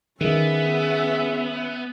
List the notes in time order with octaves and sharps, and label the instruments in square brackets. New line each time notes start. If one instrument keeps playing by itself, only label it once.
[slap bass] D#3 [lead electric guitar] B3 [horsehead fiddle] C#4 E5 [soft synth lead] G#4